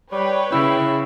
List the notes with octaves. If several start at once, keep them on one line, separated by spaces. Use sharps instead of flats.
G3 B4 C#5 G5
C#3 E4